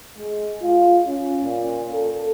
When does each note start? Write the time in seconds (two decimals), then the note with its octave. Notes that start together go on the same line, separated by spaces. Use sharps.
0.18 G#3
0.62 F4
1.07 C#4
1.43 A#2
1.93 A4